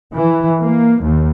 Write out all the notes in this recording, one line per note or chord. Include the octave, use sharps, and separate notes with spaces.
E3
A#3
D#2